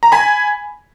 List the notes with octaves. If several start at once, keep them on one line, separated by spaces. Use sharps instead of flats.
A#5
G#5 B5